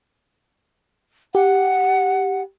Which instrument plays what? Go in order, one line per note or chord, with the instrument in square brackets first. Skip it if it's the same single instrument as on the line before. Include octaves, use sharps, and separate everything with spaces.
[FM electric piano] G4 [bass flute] F#5